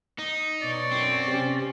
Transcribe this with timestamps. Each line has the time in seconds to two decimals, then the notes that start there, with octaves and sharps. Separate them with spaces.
0.19 D#4
0.62 B2 C#5 D5
0.91 F#2 C4
1.28 C3 C#4 G4